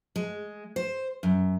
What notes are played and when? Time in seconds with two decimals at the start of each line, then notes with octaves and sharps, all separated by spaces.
0.16 G#3
0.76 C5
1.23 F#2